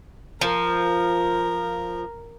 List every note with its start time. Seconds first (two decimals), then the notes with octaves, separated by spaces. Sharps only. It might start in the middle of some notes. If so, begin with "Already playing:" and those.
0.41 F3 A#4